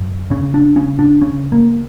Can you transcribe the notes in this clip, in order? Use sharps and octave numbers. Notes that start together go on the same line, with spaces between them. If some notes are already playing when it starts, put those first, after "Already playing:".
Already playing: F#2
C#3 C#4
D4
C#3 C#4
D4
C#3 C#4
A#3